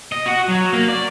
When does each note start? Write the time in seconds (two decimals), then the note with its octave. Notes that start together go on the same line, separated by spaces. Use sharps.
0.12 D#5
0.26 F#4
0.48 F#3
0.73 A#3
0.89 D5